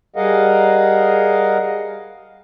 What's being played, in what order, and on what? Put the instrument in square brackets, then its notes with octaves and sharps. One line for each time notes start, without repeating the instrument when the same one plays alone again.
[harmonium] G3 G#4 A#4 D#5 F5 F#5